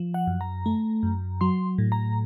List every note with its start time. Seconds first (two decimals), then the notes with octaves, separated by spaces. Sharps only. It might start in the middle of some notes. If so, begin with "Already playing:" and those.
Already playing: F3
0.14 F#5
0.27 F#2
0.41 A#5
0.66 A3
1.03 F#2
1.41 F#3 C6
1.78 A2
1.92 A#5